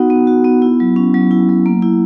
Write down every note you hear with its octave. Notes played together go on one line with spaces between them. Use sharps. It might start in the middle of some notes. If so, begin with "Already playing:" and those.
Already playing: B3 D#4 F#4 F#5
B3
F#4
B3
E4
F#3
C#4
F#3
E4
F#3
A#3
E4